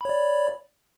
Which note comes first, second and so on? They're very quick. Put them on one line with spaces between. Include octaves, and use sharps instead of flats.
B5 C#5 D5